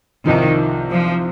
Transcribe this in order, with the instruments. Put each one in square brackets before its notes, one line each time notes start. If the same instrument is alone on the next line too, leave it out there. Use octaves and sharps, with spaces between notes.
[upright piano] C2 C3 F3 C4 D#4 [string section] D#3
[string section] F3